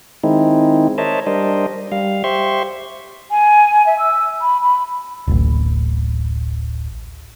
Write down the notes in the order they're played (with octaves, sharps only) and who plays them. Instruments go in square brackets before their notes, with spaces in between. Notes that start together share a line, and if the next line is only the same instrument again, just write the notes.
[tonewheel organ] D#3 G#3 C4 D#4 E4
A#4 C5 C#5 D#5 E5 A5
G3 D4 A#4 C5 D#5
G3 F5
G4 C5 E5 C6 C#6
[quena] G#5
E5
E6
B5
B5
[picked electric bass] D1 A1